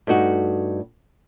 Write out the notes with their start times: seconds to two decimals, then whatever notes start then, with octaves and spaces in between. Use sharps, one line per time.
0.07 G2 A3 D#4 F#4